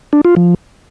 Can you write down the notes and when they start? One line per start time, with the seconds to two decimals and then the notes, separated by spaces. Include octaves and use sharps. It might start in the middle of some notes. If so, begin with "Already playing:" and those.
0.13 D4
0.25 F4
0.36 F3